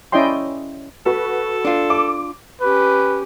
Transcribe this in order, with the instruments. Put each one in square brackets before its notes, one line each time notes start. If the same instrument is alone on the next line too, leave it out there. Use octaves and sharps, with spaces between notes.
[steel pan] C#4 E4 D5 D#5 G5 C6
[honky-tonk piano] F#4 B4 [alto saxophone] A4
[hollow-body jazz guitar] D4 F4
[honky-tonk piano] D6
[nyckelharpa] C#4 G4 [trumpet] B4